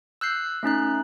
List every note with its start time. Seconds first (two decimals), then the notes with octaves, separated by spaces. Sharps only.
0.21 E6 F#6 G6 C7
0.63 A3 C#4 D#4 F#6